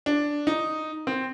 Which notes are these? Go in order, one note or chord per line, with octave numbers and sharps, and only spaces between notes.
D4
D#4
C4